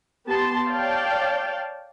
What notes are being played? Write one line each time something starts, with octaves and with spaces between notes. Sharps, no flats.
B3 G4 A5 C6
C#5 D5 F5 G5 A5